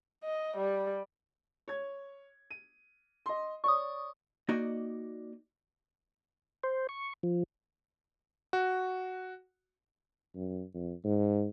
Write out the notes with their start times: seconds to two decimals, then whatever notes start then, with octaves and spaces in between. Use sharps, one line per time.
0.24 D#5
0.57 G3
1.68 C#5 G#6
2.51 D#7
3.26 D#5 C6
3.64 C#5 D5 C#6 D#6
4.49 A#3 D#4 F#4 D5 D#5
6.63 C5
6.89 C#6
7.23 F3
8.53 F#4
10.35 F#2
10.74 F2
11.04 G#2